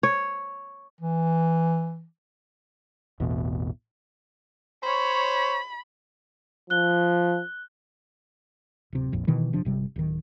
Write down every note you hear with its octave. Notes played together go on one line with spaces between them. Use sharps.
C#5
E3
A1 E2 B2
C5 C#5 B5
F3 F#6 G7
D1 C3
F1 A#1 F2
B2 D#3 E3
F#1 C3 F3 D4
G1 C3 G3
D1 D#3